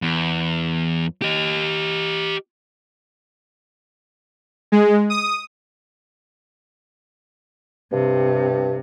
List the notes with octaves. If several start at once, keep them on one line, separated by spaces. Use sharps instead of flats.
E2
G4 D#5
G#3
D#6
G2 C3